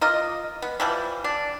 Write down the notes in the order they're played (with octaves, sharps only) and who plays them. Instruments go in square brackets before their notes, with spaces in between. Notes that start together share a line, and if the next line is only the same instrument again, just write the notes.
[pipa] A#3 F4 D#5
B3
E3 F3 G3
D4